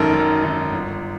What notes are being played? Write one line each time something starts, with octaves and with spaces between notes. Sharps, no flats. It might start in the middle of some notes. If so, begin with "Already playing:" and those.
Already playing: G#1 F#2 D#3 A4 A#4
G#1
F#2 D#3
G1